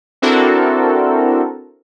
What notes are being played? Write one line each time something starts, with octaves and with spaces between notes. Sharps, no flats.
C4 D4 E4 F#4 A4 A#4